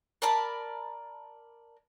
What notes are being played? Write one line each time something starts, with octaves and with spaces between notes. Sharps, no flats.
A#4 D5 A5 B5